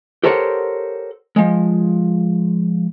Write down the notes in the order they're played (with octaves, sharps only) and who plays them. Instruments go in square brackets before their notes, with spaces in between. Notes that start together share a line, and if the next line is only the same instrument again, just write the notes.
[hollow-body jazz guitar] G4 A4 A#4 C5 C#5 F#5
F3 G#3